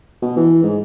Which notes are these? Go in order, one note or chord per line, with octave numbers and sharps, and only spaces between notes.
B2
E3
G#2